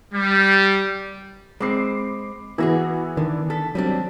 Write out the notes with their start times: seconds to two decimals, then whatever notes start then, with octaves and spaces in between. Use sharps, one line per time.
0.14 G3
1.60 G#3 C4 B5 D6 C7
2.58 E3 B3 E4 F#4 G#4 A#6
3.17 D3 D#3
3.50 A4 B6
3.75 F#3 G3 C4 D4